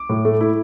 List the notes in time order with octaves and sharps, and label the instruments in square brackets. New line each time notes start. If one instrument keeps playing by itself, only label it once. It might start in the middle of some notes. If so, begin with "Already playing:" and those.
Already playing: [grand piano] D6
A2
A3
E4